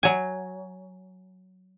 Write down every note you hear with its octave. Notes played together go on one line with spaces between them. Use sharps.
F#3 G#5